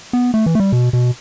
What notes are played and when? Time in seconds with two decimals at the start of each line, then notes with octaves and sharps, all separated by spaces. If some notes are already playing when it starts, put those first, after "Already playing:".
0.13 B3
0.34 A3
0.46 E3
0.55 A3
0.60 G3
0.72 B2
0.93 B2